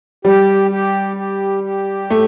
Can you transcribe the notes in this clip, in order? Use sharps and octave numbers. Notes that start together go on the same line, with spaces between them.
G3 G4
G4
G4
G4
A2 A3